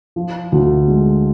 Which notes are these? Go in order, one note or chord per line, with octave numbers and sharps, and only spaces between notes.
F3
D2
G#3